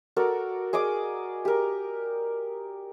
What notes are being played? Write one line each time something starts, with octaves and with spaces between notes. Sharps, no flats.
F#4 A4 A#4 D5
G#4 D5 D#5 D6
G4 A#4